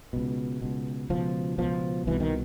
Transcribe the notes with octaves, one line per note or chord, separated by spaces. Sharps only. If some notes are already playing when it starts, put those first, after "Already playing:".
C#2 B2
C#2 B2
C#2 B2 F3
C#2 B2 F3
C2 B2 E3
D#3